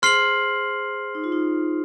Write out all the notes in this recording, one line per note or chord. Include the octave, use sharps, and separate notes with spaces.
G#4 C5 C6 F6 C7 F#7
D#4
F4
D#4